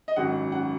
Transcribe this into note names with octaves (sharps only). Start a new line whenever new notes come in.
D#5
G#1 F#2 F#3 C#4 F#5
F#3 C#4 F#5